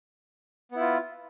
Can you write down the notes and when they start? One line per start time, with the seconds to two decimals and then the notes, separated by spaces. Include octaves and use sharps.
0.71 B3
0.76 E4
0.80 F4